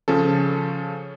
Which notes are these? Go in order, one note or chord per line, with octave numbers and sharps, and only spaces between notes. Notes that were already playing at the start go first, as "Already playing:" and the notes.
C#3 F3 C#4 A4